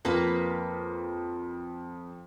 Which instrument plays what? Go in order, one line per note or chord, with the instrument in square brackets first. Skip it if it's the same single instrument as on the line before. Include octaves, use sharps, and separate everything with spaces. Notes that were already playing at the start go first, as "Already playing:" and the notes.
[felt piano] F2 [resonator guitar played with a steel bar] A#3 B4